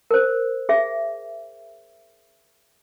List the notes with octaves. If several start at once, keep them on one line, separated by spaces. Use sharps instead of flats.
A#4 C5
G#4 E5